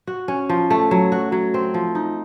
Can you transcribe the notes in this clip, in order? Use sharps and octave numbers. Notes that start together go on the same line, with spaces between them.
F#4
C#4
F3
A3
F#3
F#4
F#3
C4
F3
D#4